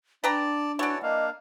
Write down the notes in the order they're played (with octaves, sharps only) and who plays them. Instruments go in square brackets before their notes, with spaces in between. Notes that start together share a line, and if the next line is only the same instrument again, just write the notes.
[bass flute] D4 [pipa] B4 G5 A#5 [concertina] D5 A5
[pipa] E3 D5 [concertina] F#4 C#5 A5
[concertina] A#3 D4 F5 [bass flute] D#5